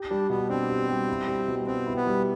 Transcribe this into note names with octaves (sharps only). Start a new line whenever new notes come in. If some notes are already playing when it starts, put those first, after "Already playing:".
Already playing: G4
G3 D4
B2 B3
C4 D4
G4
G3
E4
G3
B2
B3 C4
E4
B3
G3